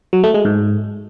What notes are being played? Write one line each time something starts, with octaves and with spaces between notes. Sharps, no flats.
F#3
A3
G#3
G#2